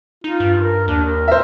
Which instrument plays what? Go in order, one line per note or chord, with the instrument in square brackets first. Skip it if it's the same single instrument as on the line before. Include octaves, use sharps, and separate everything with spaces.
[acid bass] D#4 [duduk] F4
[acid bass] G2
[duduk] A#4
[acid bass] D#2 [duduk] D4
[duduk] A#4
[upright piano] C5 E5